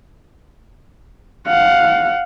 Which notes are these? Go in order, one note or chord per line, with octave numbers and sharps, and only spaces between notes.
F5 F#5